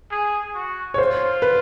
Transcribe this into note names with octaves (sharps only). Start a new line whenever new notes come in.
G#4
F#4
C#5
F4 C5
B4